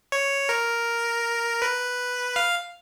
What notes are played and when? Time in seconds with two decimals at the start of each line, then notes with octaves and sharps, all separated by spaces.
0.12 C#5
0.49 A#4
1.62 B4
2.36 F5